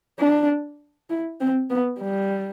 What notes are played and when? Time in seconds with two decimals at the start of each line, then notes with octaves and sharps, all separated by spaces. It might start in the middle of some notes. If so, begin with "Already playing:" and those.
0.19 D4
1.10 E4
1.40 C4
1.70 B3
2.00 G3